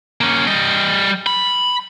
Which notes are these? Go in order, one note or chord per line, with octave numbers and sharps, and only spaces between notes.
A#3 C#4
G3 D#5
B5